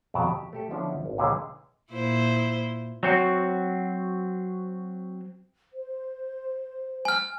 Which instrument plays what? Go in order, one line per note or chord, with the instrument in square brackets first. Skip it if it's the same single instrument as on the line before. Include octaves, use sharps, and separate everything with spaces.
[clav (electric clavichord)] F2 B2 F#3 D5 A5
G4
A3 G4 A4
D3 F3 B3 C#4 D4 E4
G#1
C#2 A#2 D3 E4 G#4 G#5
[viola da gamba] A#2 E4 C5
[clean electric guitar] F#3 C4 F#4
[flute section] C5
[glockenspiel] G#5 F6